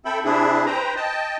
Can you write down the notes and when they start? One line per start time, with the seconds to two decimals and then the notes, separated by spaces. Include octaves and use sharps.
0.05 C4 A4 E5 G5 B5
0.24 C3 D4 E4 G#4
0.66 B4 C5 G5 A#5
0.96 D#5 G5 A5